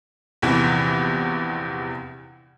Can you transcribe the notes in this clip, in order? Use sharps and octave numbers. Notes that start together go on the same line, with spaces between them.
A#1 E2 C3 E3